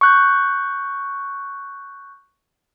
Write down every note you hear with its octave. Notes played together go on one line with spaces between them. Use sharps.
C#6 F#6 G6